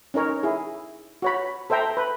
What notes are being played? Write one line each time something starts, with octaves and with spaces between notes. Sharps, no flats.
C#4 D#4 A#4 C#5
E4 G#4
F#4 C#5 B5
A4 C5 E5 G5 A#5
B4